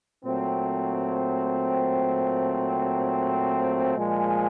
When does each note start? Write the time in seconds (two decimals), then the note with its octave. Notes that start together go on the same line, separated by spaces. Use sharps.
0.24 A#2 F#3 A3 C4
3.96 A#2 F3 G#3